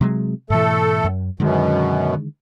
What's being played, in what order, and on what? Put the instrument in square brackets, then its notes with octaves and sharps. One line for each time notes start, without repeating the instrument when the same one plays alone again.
[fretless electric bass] C3 F#3 G#3
[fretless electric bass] G#2 B2 E3 [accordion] A3 A4
[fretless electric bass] F#2
[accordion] F#2 B2 [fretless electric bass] D3 D#3 G#3